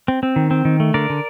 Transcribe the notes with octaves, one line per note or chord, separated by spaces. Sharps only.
C4
C4
D#3
C4
D#3
A3
D3 A#4 D5
D3